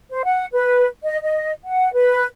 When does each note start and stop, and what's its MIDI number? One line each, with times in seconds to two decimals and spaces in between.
0.10 0.21 72
0.25 0.45 78
0.54 0.86 71
1.04 1.21 75
1.23 1.52 75
1.64 1.92 78
1.93 2.25 71